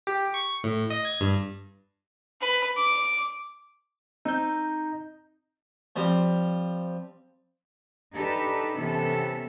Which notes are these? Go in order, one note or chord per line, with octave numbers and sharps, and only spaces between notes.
G4
C#6
A2
D#5
G#6
G2
B4
D6
C4 D#4 E6 G6
F3 G3 C4
D4 D#4 G4 A4 B4
C3 E3 B3 C#4 A4